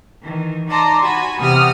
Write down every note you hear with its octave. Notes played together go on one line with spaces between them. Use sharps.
D#3 E3
D#4 D5 A5 A#5 C6
F#4 G#5 A5 B5
E2 C3 F#5 D#6 F6